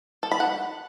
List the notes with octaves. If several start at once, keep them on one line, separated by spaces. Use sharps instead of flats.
A4
B5
F#5